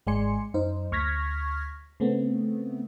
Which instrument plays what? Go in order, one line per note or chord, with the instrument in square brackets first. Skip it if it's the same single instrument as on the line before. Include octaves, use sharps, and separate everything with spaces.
[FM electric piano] G#1 G#3 D5 G#5 C6 C#7
F#2 D#4 C5
D2 C#6 F6 G#6 A#6 B6
C#3 A3 B3 C4